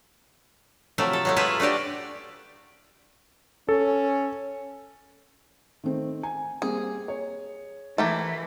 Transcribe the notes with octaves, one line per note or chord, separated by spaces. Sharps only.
C3 F3 F#3 A3
A4
F#3 G#3 A3
A3 E4 F4 G#4 B4
A3 D4 F#4 G4 D5
C#4 A4
D#3 A3 C4
G#5
G3 A#3 C4 G#4
C#5
E3 A3 E4 G4 A#4